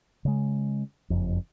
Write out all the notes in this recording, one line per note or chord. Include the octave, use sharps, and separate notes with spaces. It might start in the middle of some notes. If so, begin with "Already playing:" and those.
C#3 G#3
F#1 F2